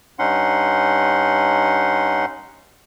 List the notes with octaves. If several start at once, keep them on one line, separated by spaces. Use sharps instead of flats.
G2 C#4 D#4 F#5 C6